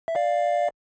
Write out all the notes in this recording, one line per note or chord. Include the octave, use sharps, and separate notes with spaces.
E5
D5 F5